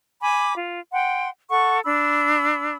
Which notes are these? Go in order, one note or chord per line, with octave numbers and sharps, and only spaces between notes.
G#5 B5 D6
F4
F#5 G5 C6
A4 F#5 C#6
D4 B5 E6